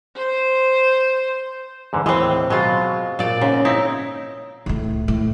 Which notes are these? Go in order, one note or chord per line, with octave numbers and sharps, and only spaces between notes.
C5
E2 G#2 D3
D#2 A2 E3 G#3 C4
B2 F#3 G#3 F4
A#2 D5
G#2 C#3
C4 D#4 E4
C#2 A2
A2